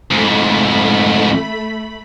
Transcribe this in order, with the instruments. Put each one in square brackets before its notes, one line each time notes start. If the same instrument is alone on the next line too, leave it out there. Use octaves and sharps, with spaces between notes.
[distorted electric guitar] F2 G#2 [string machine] A3 B5